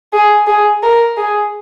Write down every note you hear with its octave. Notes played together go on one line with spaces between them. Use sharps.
G#4
G#4
A#4
G#4